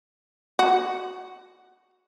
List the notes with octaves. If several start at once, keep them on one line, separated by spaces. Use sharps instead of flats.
F#4